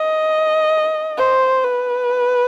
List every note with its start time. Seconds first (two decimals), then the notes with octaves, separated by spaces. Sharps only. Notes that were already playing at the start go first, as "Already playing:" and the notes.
Already playing: D#5
1.18 C5
1.64 B4